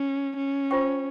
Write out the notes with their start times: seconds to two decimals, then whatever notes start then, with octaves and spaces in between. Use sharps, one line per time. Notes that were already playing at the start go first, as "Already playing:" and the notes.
Already playing: C#4
0.38 C#4
0.71 F4 C5 G5 C#6